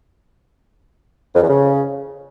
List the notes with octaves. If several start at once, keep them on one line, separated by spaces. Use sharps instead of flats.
F2
E2
C#3